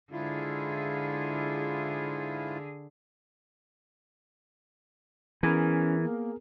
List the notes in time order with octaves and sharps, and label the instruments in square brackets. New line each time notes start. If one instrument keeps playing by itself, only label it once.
[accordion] G#2 E4 F4 [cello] D3 G#4
[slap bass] E3 [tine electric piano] B3 G#4 A#4 [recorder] C#4
[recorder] A#3